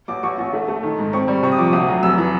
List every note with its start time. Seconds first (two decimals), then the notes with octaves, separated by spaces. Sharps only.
0.08 A1 D6
0.23 A1 C#6
0.38 A1
0.53 A3
0.68 A3
0.83 D#3
0.98 G#2
1.13 C4 C#6
1.28 G3
1.43 C3 C#6
1.52 D#6
1.58 F3 D6
1.73 D2 D#6
1.88 F#3
2.03 F1 E6
2.18 E3